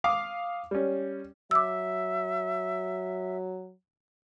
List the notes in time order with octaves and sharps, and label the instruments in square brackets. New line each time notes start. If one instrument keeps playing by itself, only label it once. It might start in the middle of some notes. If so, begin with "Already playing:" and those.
[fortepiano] F5 D6 D#6
G3 C#4
[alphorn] F#3 [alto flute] E5 [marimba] D6 E6